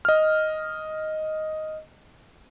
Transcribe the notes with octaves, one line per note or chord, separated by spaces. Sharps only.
D#5 F6